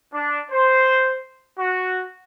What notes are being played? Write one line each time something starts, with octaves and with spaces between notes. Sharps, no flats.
D4
C5
F#4